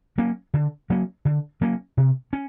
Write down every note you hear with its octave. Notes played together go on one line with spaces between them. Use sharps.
F#3 A#3 C#4
D3
F#3 A#3 C#4
D3
F#3 A#3 C#4
C3
C#4